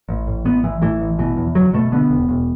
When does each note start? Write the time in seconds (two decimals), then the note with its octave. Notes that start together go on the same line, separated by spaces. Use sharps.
0.09 A1
0.27 A2
0.45 A1 B3
0.64 A1 E3
0.82 A2 E3
1.00 A1
1.19 B2 E3
1.37 E2
1.55 F#1 F#3
1.73 B2 A3
1.92 D3 B3
2.11 E1
2.29 E1